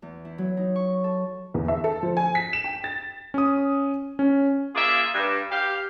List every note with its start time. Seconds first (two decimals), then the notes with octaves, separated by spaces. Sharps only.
0.02 E2
0.25 E4
0.38 F#3
0.57 D#4
0.76 C#6
1.04 A4
1.54 E2
1.68 E5
1.84 A4
2.03 F3
2.17 G#5
2.35 B6
2.53 E7
2.64 G5
2.84 A6
3.34 C#4 D#6
4.19 C#4
4.75 A#3 F4 G#4 D5 E5
5.14 G2
5.51 G4 F5